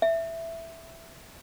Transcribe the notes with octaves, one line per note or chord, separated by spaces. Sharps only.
E5